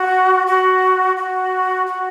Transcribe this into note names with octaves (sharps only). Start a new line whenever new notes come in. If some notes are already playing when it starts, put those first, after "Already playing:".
Already playing: F#4
F#4
F#4
F#4